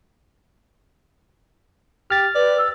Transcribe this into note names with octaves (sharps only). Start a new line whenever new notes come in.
G4 F6 A6
B4 D5
E6